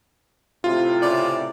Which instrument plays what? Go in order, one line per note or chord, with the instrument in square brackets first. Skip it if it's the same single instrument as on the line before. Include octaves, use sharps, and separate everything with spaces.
[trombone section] A2 C3 [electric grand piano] F4
[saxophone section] C#3 D5